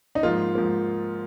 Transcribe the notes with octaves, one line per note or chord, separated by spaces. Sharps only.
D#4
G#2 F3 A#3 F4
G#2 F3 A#3